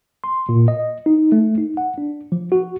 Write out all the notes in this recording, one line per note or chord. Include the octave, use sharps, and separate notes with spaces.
C6
A#2
D#5
D#4
A3
D#4
F#5
D4
F3
F#4